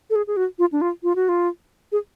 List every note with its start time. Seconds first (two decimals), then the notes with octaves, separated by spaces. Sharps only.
0.10 A4
0.16 G#4
0.27 G#4
0.37 F#4
0.59 F4
0.72 D4
0.81 F4
1.03 F4
1.16 F#4
1.29 F4
1.92 G#4